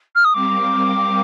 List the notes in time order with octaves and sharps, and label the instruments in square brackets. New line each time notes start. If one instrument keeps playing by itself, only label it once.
[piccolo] F6
D#6
[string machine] G3 C4 G4 A#4 F5 [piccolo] D6